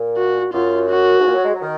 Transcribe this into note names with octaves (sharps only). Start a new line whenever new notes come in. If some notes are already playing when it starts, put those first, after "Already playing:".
Already playing: A#2
F#4
F#2 F4
F#4
G#2
A#2
F#3
G#3
F#3
D#3